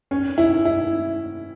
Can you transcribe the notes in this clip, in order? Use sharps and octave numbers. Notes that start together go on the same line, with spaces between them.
C#4
E4
E4